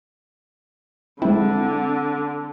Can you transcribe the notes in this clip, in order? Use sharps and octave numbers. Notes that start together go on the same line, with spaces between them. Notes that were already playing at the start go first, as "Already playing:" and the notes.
D3 G#3 C4 E4